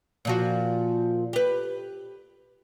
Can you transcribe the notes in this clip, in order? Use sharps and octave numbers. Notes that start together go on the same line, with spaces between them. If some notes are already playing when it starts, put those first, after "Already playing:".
A#2 F3 F#4
G4 B4